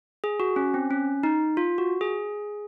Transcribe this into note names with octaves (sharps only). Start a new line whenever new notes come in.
G#4
F#4
C#4
C4
C#4
D#4
F4
F#4
G#4